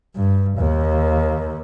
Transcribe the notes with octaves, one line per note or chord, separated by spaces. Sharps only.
G2
D#2